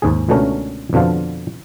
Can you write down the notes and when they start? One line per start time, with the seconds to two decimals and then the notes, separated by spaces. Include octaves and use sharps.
0.02 D#2 G#2 G#4
0.29 C#2 B2 D3 A3 C#4 A#4
0.93 F2 B2 D3 F3 F4